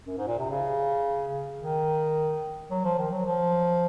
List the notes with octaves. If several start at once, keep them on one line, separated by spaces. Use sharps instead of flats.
F#2
G#2
A#2
C3
C#3
D#3
F#3
F3
D#3
F#3
F3